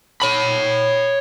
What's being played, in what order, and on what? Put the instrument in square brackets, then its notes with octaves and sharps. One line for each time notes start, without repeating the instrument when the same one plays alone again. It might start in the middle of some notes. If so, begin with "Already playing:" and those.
[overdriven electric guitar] C#5 B5